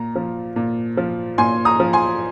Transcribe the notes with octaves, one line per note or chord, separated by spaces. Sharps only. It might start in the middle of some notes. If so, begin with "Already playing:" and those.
Already playing: A#2 A#5
F3
A#2
F3
A#2 G#5 C6
A#5 D#6
F3
G#5 C6